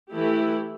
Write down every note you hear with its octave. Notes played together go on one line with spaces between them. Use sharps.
E3 A3 E4 G4